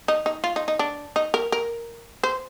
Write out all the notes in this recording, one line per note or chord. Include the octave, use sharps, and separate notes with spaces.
D#4
D#4
F4
D#4
D#4
D4
D#4
A#4
A#4
C5